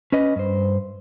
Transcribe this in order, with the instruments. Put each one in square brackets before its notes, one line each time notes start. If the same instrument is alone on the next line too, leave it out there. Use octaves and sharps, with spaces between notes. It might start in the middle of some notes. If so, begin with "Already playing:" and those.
[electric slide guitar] C#4 B4 D#5
G2 C5